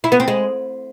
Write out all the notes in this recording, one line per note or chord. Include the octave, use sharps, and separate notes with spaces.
E4
B3
C4
G#3